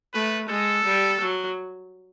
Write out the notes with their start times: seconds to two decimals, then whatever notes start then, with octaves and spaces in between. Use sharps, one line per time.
0.14 A3 B4
0.50 G#3 A4
0.85 G3
1.21 F#3